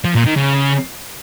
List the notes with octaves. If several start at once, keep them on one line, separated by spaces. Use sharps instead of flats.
F3
A#2
D#3
C#3